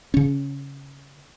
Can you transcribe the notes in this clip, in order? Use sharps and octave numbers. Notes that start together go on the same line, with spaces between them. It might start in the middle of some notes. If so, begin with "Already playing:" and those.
C#3 C#4